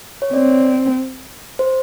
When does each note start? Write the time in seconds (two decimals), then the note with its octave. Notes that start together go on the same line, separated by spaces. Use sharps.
0.22 C#5
0.33 C4 D5
1.59 C5